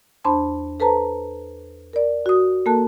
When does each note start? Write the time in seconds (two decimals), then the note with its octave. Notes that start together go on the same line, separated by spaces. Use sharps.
0.24 E2 D4 C5 A5 B5 C6
0.80 A4 B4 C5 A5 A#5
1.93 A#4 D5
2.26 F#4 D#6
2.66 A#3 A4 A#4 A5 F#6